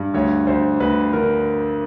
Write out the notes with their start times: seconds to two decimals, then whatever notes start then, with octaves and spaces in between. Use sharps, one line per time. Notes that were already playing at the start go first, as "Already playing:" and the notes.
Already playing: G2
0.14 D2 C#5
0.47 D2 C5
0.80 D2 B4
1.13 D3 A#4